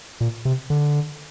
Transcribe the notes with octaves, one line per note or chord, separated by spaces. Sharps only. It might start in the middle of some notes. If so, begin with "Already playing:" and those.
A#2
C3
D3